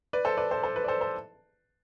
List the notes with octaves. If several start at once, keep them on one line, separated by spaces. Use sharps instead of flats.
B4 D5
A4 C5
B4 D5
A4 C5
A4 C5
B4
D5
A4 C5
A4 C5